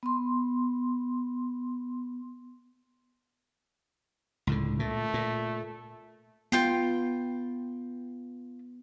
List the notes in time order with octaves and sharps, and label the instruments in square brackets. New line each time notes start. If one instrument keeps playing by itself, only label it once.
[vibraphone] B3 C6
[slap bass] C#2 A2 D3
[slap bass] A#2 [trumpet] A3
[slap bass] A#2
[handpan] B3 [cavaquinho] F4 G5 C6